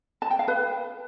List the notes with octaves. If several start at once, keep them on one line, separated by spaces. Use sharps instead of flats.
A5
G5
F5
B4